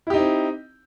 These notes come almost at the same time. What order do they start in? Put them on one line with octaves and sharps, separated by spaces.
E4 G4 D#4 C4